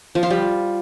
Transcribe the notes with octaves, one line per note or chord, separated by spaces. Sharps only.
F3
F4
G3